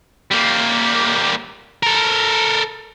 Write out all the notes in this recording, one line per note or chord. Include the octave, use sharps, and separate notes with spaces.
G3 A#3
A4 A#4